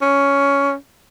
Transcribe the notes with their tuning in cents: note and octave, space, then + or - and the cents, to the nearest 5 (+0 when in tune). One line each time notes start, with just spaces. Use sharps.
C#4 +10